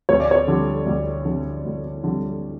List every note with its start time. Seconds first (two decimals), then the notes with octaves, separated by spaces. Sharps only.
0.09 D2 C#5
0.20 D5
0.31 C#5
0.47 D3 G3
0.86 D2
1.25 D3 G3
1.65 D2
2.04 D3 G3